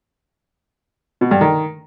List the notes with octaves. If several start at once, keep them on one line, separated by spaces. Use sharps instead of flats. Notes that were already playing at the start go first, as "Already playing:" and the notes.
B2
G2
D#3